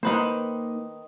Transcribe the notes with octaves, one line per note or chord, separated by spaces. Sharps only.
D#3 A#3 D#4 B4 C5